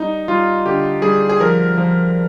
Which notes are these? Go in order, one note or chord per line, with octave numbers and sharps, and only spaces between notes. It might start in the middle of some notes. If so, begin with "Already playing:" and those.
Already playing: G3 D#4
G3 F4
D3 G4
G3 G#4
G#4
F3 A#4
F3